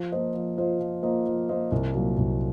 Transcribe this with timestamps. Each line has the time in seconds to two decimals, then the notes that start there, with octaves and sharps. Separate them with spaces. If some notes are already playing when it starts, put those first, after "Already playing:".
Already playing: F3
0.12 A#3 F4 C5 D#5
0.34 F3
0.58 A#3 F4 C5 D#5
0.80 F3
1.03 A#3 F4 C5 D#5
1.27 F3
1.49 A#3 F4 C5 D#5
1.72 C2
1.94 A#2 F#3 A#3
2.18 C2